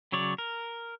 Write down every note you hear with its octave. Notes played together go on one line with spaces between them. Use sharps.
C#3 F#3 C#5 D5
A#4